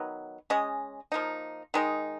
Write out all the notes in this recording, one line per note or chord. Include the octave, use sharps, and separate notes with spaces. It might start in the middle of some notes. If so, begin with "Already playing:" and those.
Already playing: D#3 F#3 B3
G#3 C#4 G#4 D#5
F3 A#3 D#4
D#3 G#3 D#4